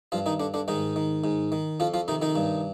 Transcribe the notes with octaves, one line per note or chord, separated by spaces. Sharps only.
G2 F3 F4
D#3 D#4
D3 D4
D3 D4
G#2 D#3 D#4
D#3
G#2
D#3
F2 F3 F4
F3 F4
C3 D#3 D#4
D#3 D#4
G2